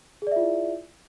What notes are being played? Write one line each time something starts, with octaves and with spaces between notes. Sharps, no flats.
E4 F4 G#4 D5 E5